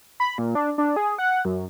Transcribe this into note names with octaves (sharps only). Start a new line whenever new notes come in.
B5
A#2
D4
D4
G#4
F#5
F#2